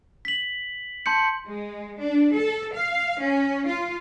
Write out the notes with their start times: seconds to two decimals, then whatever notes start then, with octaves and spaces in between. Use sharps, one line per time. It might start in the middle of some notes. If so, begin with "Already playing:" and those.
0.25 B6 F#7
1.06 A5 C6 G6 C#7
1.47 G#3
2.01 D4
2.36 A4
2.76 F5
3.23 C#4
3.68 F4